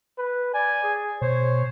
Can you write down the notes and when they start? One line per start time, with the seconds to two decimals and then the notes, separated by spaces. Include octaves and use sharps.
0.18 B4
0.54 D5 G#5
0.84 G#4
1.22 B2 C5 C#5